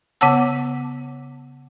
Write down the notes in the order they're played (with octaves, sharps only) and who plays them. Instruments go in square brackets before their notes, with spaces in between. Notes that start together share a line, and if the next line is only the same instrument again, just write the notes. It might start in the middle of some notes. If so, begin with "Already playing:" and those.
[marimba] C#3 B3 C#5 F#5 A5 E6